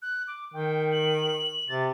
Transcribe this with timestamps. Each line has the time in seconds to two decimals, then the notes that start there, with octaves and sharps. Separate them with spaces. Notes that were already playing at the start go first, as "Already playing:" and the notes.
0.02 F#6
0.27 D6
0.54 D#3 G5
0.92 F#7
1.69 C3 A6